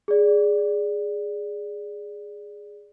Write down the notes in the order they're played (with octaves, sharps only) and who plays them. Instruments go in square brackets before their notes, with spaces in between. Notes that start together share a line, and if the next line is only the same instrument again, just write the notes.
[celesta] G#4 D5